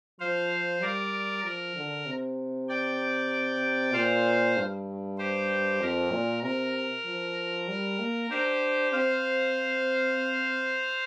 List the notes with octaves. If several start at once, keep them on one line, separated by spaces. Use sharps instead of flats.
F3 C5 F5
G3 A#4 D5
F3 A#4
D3
C3
D5 G5
A#2 C5 F5
G2
G4 C5
F2 A#4
A#2
C3 A#4
F3
G3
A#3
D4 G4 C5
C4 C5 F5